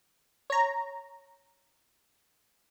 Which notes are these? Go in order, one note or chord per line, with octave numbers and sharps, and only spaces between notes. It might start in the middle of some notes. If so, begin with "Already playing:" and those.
C#5 A#5